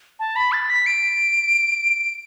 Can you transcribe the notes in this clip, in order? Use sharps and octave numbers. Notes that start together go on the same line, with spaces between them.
A5
B5
A6
B6
D7